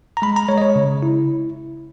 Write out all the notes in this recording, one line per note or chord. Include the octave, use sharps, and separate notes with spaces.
A#5
G#3 B5
A#5
G#3 C#5
D#5
C#5
C#3
E4